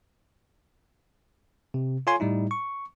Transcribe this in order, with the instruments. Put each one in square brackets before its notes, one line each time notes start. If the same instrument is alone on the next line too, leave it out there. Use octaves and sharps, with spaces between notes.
[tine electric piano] C3
F4 A4 C#5 G#5 C6
A2 G3 D#4 E4
C#6